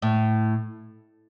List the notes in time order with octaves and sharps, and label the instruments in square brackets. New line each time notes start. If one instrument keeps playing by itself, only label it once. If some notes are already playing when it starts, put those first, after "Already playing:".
[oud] A2